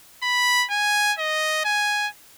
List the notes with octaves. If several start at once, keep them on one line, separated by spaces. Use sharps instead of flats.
B5
G#5
D#5
G#5